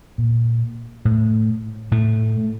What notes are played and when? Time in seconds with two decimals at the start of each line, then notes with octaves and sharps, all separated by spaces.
0.18 A#2
1.05 A2
1.91 A2 A3